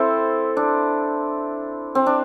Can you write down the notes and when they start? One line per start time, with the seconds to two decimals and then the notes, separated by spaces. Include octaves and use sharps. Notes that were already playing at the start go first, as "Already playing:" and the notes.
Already playing: C4 E4 A4 C5
0.57 D4
1.95 C4
2.06 D4